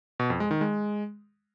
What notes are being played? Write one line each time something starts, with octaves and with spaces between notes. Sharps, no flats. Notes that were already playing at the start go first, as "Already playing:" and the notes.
B2
F2
G#3
D#3
G#3